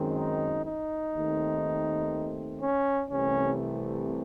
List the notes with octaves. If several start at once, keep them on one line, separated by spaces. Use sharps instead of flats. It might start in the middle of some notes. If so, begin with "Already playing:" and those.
Already playing: F#2 D#3 G#3 C4
D#4
D#4
D#2 D#3 A3 C4
C#4
C2 C3 E3 A3 C#4